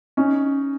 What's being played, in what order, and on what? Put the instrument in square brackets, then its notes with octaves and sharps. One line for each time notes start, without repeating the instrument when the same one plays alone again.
[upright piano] C#4 D#4